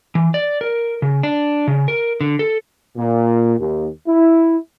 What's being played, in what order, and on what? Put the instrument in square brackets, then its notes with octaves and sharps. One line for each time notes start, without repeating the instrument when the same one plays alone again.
[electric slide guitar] E3
D5
A#4
C#3
D4
C#3
A#4
D3
A4
[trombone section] A#2
D#2
E4